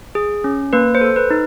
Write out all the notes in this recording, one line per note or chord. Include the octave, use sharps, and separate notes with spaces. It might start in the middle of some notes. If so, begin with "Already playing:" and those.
G#4
C#4
A#3 B4
C5
A4
B4
D#4